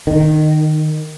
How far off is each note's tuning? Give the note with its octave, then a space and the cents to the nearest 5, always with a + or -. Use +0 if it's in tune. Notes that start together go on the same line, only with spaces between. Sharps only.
D#3 -15